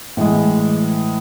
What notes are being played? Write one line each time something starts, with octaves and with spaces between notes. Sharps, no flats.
A2 E3 G#3